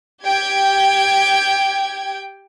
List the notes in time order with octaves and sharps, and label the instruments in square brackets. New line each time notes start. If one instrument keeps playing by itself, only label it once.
[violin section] G4 G5 G#6